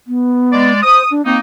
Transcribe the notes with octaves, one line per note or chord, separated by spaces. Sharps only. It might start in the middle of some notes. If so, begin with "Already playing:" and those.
B3
G#3 D5
C5 D#6
D4
A#3 C4 D#4